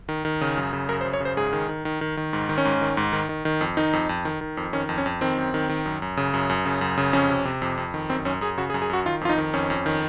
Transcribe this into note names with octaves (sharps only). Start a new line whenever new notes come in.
D#3
D#3
C#3
F#2
C#3
F#2 A#4
C5
F#2
C#5
C#3 C5
G#2 G#4
D#3
D#3
D#3
D#3
D#3
G#2
D#3
C#4
G#2
D#3
G#2
D#3
D#3
D#3
F2
D#3 D#4
F2
F2
D#3
D#3
F2
D#3 C#4
F2
C#4
F2
D#3 C4
F#2
D#3
D#3
F#2
F#2
C#3
F#2
F#2
C#3
F#2
C#3
F2 C#4
C3
C3
F2
F2
D#3
F#2 C4
F#2 C#4
F#2 G#4
C#3 F#4
G#4
F#2
G#4
F#2 F#4
D#3 F4
F2 F4
D#4
D#3
F2 C#4
F2
D#3